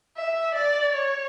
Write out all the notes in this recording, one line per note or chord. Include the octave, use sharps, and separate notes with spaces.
E5
D5
C#5